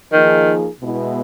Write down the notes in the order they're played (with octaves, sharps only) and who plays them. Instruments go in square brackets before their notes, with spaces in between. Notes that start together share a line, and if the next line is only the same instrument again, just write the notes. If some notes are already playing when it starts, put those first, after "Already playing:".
[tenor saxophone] D#3 [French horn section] F3 A#3 D#4 G#4
[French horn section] B2 G#3 B3 E4